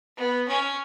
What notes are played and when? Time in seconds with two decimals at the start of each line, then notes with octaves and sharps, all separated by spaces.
0.17 B3
0.48 C#4